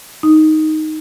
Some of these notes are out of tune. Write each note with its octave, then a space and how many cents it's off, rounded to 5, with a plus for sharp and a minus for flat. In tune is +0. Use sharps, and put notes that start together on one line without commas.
D#4 +0